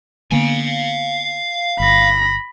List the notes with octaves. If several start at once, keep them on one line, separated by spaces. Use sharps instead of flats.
D3 A#3 B3 F5 G#5
G1 B5 A#6